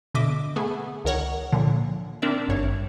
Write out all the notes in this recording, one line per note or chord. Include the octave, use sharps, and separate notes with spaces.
B2 D3 D#5 E5 D6
A3 B3 G#4
C#2 D#3 A#4 C#5 F#5
A#2 D3 F3
C4 D4 A#4 D5 E5
G#1 G2 C#5